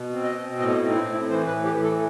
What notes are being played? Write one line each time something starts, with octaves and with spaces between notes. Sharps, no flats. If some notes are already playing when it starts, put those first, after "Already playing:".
Already playing: B2
C4
D#5
B2
A2 D#5
E4
C4
D#4
E4
A2
E4
E3 C5
B4
A2
G4
E3
A4